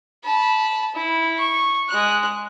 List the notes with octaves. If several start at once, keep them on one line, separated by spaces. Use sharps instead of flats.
A5 B5
E4
C#6
G#3 F#6